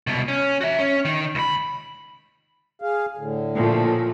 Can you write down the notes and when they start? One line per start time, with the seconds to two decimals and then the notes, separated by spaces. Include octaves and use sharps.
0.07 C2 B2
0.28 C#4
0.61 F#4 E5
0.78 C#4
1.05 D#3
1.35 C#2 B5
2.82 G#4 F5
3.17 A2 D3
3.55 A#2 F3 A3